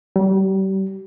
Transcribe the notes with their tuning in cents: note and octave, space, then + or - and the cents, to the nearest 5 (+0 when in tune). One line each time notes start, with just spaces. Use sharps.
G3 -35